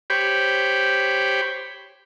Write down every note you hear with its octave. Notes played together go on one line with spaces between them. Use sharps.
G4 C5 C#5 G5 B5